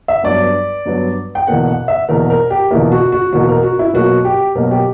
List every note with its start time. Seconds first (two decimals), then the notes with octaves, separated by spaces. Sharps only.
0.08 E5
0.24 G2 F#3 B3 D5
0.86 G2 F#3 B3
1.35 G5
1.47 E2 B2 A#3 F#5
1.68 F#5
1.88 E5
2.09 E2 B2 A#3 A#4
2.30 A#4
2.50 G4
2.71 E2 B2 A#3 E4
2.92 F#4
3.12 F#4
3.33 E2 B2 A#3 F#4
3.48 A#4
3.63 F#4
3.79 E4
3.94 B2 F#3 A#3 F#4
4.25 G4
4.55 B2 F#3 A#3 A#4
4.71 G4